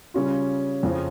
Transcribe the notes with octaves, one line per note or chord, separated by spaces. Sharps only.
C#3 G3 C#4 F4
F2 C#3 F3